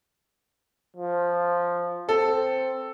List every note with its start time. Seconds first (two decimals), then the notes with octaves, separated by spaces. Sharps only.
0.97 F3
2.09 C4 A4